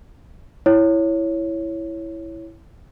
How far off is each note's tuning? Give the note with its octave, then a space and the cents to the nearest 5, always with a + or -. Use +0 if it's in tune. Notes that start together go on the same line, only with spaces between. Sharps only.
E4 +0 C#5 +0